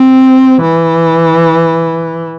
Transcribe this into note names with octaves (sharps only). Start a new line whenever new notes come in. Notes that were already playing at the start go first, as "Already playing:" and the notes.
Already playing: C4
E3